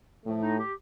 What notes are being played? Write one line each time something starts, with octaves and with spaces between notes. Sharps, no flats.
A2 F3 A3
D#4
G4